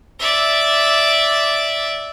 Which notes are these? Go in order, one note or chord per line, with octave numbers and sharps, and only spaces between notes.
D5 E5